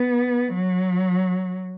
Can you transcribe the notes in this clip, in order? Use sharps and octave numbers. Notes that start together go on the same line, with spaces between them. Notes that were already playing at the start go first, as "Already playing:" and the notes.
Already playing: B3
F#3